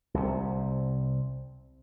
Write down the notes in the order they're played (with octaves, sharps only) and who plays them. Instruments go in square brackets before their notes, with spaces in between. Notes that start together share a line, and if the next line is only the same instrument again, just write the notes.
[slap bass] C2 C3